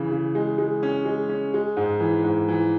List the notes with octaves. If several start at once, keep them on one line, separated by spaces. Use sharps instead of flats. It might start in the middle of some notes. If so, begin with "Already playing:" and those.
Already playing: C#3 E3
C#3
G#3
G#3
C#4
G#3
C#4
G#3
G#2
E3
G#2
E3